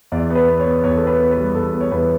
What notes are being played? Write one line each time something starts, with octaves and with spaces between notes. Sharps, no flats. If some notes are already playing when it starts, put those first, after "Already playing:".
E2 D5
B3
B4
B3
C#5
B3
E2 C#5
A4
B3
B4
B3
B4
G3
E2 A4
B3
C#5
E2 B4